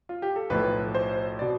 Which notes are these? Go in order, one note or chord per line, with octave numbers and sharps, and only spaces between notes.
F4
G4
A4
B1 A2 F3 B4
C5
B2 D5